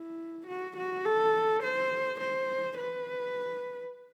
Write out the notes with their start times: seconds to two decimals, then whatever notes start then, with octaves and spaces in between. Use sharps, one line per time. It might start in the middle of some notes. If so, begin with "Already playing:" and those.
Already playing: E4
0.47 F#4
0.77 F#4
1.05 A4
1.63 C5
2.21 C5
2.78 B4